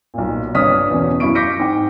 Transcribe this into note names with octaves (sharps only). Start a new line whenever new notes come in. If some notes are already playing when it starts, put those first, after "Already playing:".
B1 A#2
G1 D4 C#5 D#6 F6 B6
E2 B2 C#4
F#2 E4 C#6 D7
D6 G6 A#6 B6 C#7 D7
G#2 G5